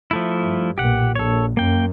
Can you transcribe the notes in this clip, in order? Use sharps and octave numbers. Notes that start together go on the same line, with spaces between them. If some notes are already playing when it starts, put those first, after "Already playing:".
F3 A3 E4
G2
B1 A#2 G4 F#5
A#1 A4 C#5
F#2 A#3 G5